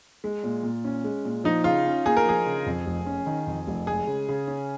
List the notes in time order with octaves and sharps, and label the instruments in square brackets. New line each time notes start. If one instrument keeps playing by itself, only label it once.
[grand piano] G#3
A#2
A#2
C#4
G#3
A#2
[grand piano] F3 [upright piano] D#4
[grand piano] C#3 [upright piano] F4
[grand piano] C#4
[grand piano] A#3 [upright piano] G#4
[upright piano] A#4
[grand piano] F3 [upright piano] G#4
[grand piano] C#3
F2
F1
C#4
D#3
F2
F1
[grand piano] G#3 [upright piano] G#4
[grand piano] C#3
C#3
C#4